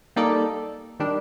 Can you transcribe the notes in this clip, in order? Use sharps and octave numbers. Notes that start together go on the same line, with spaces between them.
G3 A#3 D#4 A4 D5
D#3 G3 D4